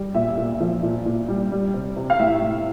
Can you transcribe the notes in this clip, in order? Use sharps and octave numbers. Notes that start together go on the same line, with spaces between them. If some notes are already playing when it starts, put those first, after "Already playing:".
Already playing: G3
A#2 E5
A#2
F3
A#2
A#2
G3
G3
C3
C3
F5
A2 E5
A2